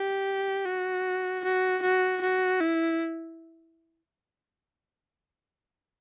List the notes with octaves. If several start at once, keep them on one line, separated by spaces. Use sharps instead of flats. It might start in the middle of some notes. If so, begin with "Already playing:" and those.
Already playing: G4
F#4
F#4
F#4
F#4
E4